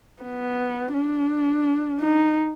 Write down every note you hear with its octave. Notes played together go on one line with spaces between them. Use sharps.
B3
D4
D#4